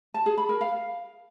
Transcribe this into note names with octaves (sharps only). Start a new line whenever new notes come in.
A5
G#4
B5
A#4
F5